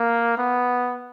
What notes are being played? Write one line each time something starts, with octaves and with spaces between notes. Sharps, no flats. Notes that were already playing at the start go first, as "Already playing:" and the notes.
Already playing: A#3
B3